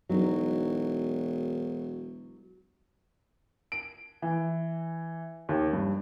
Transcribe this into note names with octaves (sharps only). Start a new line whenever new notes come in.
E1 F#3 D#4
D7
E3
D#2
G2